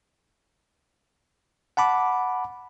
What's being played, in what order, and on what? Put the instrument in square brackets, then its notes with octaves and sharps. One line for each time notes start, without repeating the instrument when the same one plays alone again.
[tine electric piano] F#5 A5 B5 D6